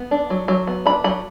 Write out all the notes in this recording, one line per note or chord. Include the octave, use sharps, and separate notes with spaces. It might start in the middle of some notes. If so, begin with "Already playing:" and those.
Already playing: B3
D4
F#3
F#3
B3
D4 B5
F#3 B5